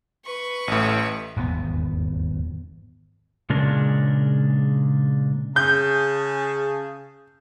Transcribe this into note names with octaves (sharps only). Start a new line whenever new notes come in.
B4 C#6
A1 A2
D#1 G#1 E2 B3
A#2 C#3 G#3 C#4 D4 A#4
C#3 G#4 A5 G6